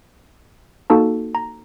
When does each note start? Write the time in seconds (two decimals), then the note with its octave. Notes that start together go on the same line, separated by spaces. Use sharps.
0.90 A#3 D#4 F#4 A4 A5
1.35 A#5